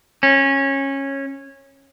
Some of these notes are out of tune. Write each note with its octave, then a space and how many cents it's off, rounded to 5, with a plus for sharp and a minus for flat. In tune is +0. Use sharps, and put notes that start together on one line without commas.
C#4 -15